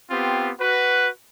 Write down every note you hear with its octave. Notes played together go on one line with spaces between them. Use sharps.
B3 C4 F4 G4
F#4 B4